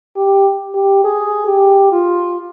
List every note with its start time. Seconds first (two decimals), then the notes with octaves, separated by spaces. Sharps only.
0.17 G4
0.74 G4
1.04 G#4
1.47 G4
1.92 F4